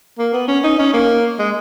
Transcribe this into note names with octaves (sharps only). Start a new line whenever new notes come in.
A#3
B3
C#4
D#4
C#4
A#3
G#3